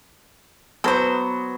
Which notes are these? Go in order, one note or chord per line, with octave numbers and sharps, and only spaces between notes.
F#3 B3 A4 C5